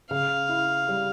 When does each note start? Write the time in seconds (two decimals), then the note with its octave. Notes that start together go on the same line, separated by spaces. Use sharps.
0.11 C#3 F5
0.49 E4
0.88 G3